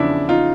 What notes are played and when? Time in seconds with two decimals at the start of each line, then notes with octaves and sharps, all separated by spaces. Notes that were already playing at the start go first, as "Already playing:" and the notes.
Already playing: E2 C#3 F3 D4 E4
0.29 D#4 F4